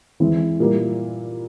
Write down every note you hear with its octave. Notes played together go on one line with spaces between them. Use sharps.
E2 E3 G#3 C4 E4
A#2 G3 A#3 E4